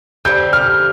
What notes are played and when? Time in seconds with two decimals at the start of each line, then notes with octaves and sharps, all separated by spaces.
0.25 D3 G3 C4 G6
0.53 F6